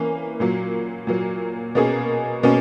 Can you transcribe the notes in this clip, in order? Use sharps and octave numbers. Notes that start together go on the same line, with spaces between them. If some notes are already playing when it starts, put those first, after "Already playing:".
Already playing: E3 A#3 C#4
A#2 F#3 A#3
A#2 F#3 A#3
B2 A#3 C#4 G#4
B2 A#3 C#4